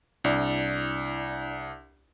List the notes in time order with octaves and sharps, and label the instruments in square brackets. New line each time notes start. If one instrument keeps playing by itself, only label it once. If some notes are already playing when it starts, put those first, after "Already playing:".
[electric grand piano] C2 [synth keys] D4 E4 D5